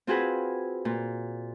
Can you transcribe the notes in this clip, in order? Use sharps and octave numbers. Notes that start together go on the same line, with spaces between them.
C4 F4 F#4 G#4 B4
A#2